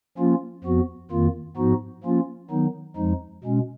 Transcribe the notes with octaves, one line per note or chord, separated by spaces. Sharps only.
F3 A#3 C#4 F4
F2 F3 B3 F#4
F2 D#3 A#3 F4
G#2 F3 B3 D#4 F#4
F3 A#3 C#4 F4
D#3 F#3 B3 D#4
F2 F3 G#3 D#4
B2 G#3 C#4